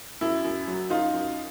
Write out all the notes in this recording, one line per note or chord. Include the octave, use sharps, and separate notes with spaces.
F#2 E4
F#2
F#3
F#2 D#4 F4
F#2